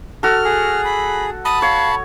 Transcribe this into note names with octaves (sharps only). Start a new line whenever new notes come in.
F#4 A4 F6
G#4
B5
A5 B5 D#6
C#5 F5